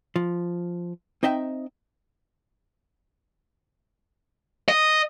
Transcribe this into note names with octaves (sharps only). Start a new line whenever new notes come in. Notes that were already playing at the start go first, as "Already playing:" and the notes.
F3
C4 D#4 D#5 E5 G5
D#5